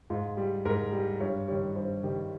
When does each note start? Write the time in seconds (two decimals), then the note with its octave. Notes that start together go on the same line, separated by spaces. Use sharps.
0.10 G#2 F4
0.37 G3
0.65 G#2 A#4
0.92 G3
1.20 G2 C#5
1.48 D#3 G3 C#5
1.75 G2 C5
2.03 D#3 G3